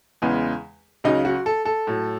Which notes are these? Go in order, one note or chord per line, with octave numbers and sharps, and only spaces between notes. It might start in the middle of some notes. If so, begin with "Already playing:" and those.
E2 C#3 E3 G#3
C#2 C#3 F#3 D#4
F#4
A4
A4
A2 F#3